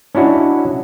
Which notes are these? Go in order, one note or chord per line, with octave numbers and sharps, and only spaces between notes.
C#4 D4 E4 F#4 D#5